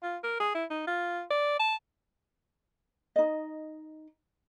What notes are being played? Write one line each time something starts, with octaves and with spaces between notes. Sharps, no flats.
F4
A#4
G#4
E4
D#4
F4
D5
A5
D#4 D#5